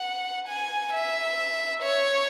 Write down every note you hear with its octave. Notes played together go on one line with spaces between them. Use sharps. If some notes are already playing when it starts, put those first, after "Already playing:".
Already playing: F#5
G#5
E5
C#5